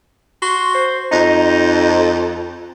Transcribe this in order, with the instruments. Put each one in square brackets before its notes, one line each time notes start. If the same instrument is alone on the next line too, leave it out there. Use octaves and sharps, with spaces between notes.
[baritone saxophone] F#4 [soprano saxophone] C6
[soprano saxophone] C5
[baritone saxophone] F2 [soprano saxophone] D#4